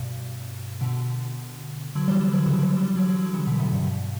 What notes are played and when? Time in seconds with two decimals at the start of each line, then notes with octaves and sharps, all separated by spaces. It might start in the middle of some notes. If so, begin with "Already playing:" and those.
Already playing: G2 B2
0.81 B2 D3
1.95 D3 F#3
2.08 E3 G3
2.21 E3 G3
2.33 D3 F#3
2.46 C#3 E3
2.59 D3 F#3
2.71 E3 G3
2.83 E3 G3
2.96 D3 F#3
3.08 D3 F#3
3.21 D3 F#3
3.34 C#3 E3
3.47 B2 D3
3.60 A2 C#3
3.72 G2 B2
3.85 G2 B2